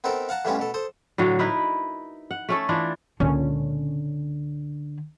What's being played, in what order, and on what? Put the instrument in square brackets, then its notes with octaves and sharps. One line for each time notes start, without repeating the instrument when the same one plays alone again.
[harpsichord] B3 C4 D#4 A4 A#4
F5 F#5 A5 A#5
A2 E3 G3 B3 C#4 F4
B2 A4
A4 C5 D#6
[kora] A2 D3 F#3 F5
D#4 E4 A#4 B4
F#5
A3 C#4 A4
E3 D4 F4
[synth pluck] C#2 A#2 C#4 [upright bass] D3